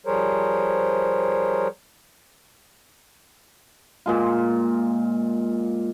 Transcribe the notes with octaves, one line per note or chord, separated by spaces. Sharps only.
F3 G3 G#4 A#4 C5 C#5
A#2 G#3 F4